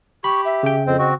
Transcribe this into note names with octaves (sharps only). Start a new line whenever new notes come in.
G4 B5 C#6
E5
C#3 G5
F2 C4 C5 D#5
C4 F#4